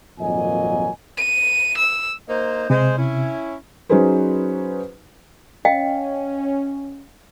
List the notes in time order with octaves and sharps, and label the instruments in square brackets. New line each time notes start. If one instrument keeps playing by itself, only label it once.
[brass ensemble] G#1 F2 A#2 F#3 D#5 G#5
[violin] D#7
E6
[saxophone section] A#3 D#4 C5
[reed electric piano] C3 [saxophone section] G#3 C5
[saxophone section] C#4 E4
[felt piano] F#3 C#4 D#4 G#4 B4 C5
[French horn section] C#4 [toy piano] D#5 F5 G5